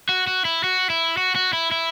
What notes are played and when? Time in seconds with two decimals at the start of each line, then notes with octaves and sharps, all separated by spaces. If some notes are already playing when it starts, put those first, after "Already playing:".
0.09 F#4
0.27 F#4
0.45 E4
0.64 F#4
0.90 E4
1.17 F#4
1.35 F#4
1.53 E4
1.71 E4